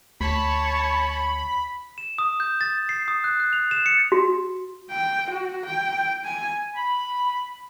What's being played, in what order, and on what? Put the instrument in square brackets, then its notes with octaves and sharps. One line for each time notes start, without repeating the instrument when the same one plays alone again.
[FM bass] D2 [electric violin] C#5 A5 [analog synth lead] B5
[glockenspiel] E7
D#6
G6
A6
C7
D#6
F#6
F#6
F7
E7
C#7
[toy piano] F#4
[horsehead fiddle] G5
F#4
G5
G#5
[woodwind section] B5